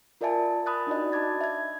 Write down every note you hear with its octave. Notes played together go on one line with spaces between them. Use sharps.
F4 A#4 D5 E5 G#5 A5
B5 D#6 F#6 A6
D4 D#4 F#4 D5 D#5
A5 B5 D6 G#6 A6
E5 G#6